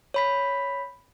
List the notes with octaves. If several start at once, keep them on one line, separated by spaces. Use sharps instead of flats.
C#5 B5 B6